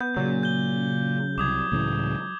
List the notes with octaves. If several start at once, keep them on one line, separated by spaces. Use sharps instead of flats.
B3 G6
A#2 C#3 F#3
G6 G7
C2 D6 D#6 G#6
C#2 A2 C#3 E3